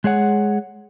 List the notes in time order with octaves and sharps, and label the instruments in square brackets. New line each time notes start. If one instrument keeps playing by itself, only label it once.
[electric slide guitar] G#3 G#4 C#5 F#5